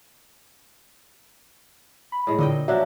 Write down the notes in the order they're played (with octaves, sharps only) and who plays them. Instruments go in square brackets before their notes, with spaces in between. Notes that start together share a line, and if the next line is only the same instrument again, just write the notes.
[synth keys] B5
[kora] A2 G#3
[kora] A#2 D#5 G5 [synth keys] D3
[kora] F3 F#3 D4 [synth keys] F#4 E5